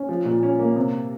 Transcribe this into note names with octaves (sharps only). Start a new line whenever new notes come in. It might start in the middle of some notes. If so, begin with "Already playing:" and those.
Already playing: C#4
F3
A#2
C#4
A#3
C3